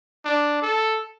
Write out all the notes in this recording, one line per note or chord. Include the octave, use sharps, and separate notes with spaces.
D4
A4